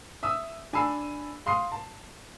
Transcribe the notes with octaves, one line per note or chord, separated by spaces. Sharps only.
E5 D#6 E6
D4 G#5 A5 B5 E6 C7
F5 C6 D#6 C7
A5